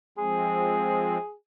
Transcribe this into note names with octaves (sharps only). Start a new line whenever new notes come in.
F3 G#3 C4 G#4